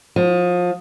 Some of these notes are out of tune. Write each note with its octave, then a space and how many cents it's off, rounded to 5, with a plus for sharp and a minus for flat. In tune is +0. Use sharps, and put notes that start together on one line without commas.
F3 +30